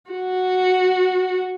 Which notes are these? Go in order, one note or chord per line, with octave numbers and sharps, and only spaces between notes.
F#4